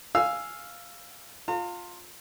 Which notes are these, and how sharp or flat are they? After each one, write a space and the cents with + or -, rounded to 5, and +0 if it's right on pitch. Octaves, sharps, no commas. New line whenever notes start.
F5 +0 G#5 +0 E6 +5
F4 +10 A#5 -45